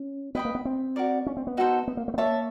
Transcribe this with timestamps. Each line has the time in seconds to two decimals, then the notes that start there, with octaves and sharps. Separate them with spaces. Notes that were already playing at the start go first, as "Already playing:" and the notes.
Already playing: C#4
0.35 B3 B4 D#5 G5 B5
0.45 A#3
0.55 B3
0.65 C4
0.96 F#4 A#4 D5
1.27 C#4
1.37 C4
1.47 B3
1.57 D#4 F#4 A4 C5
1.88 B3
1.97 A#3
2.08 A3
2.14 B3
2.18 A#3 C#5 E5 A5